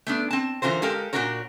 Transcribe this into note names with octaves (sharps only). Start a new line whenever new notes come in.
A3 B3 D4
C4 A5
D3 E3 F4 A#4 C5
G#3 G4 A4 A#4 F5
A#2 F3 D4 F#4 A#4 C#5